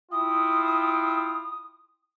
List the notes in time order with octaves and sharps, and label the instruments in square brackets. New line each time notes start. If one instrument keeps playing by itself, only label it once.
[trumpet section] E4 F4 G5 [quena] D#6